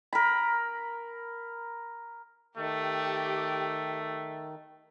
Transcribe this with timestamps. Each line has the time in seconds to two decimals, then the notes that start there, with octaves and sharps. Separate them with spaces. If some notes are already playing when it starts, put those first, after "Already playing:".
0.13 A#4 B5
2.57 D#3 A3 G4